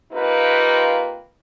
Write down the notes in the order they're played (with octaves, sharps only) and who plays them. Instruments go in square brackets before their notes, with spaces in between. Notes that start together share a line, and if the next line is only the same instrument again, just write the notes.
[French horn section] A#3 C4 D#4 F4 G4 B4